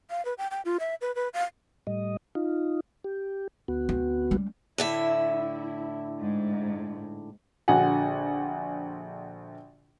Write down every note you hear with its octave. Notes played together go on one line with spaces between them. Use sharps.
F5
B4
G5
G5
F4
E5
B4
B4
F5
A2 G3 D#5
D#4 F4
G4
D2 B3 F#4
C4
G3 C#4
A2 D3 E4 E5
E4
G#2
A#1 D3 F#4 F#5 G#5